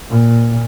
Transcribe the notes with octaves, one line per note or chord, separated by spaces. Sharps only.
A#2